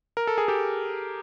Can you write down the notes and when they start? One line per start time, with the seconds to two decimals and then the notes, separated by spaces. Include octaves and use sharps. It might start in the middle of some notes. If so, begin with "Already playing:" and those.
0.17 A#4
0.27 A4
0.38 G#4
0.48 G4 A4